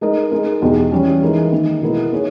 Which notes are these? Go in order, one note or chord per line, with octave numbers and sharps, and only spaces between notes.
G#3 D#4 A#4 D#5
G#3 D#4 A#4
E2 B2 G#3 D#4 G4
E3 G3 C#4
E3 G#3 D#4 A#4
D#3 A#3 D#4
B2 G#3 B3 E4 A#4
A#3 D#4 G#4 C#5